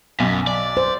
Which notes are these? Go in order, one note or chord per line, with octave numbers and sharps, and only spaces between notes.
B1 F#2
D5
C5